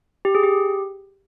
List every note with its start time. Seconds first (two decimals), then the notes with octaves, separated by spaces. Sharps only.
0.25 G4
0.35 G#4
0.43 G4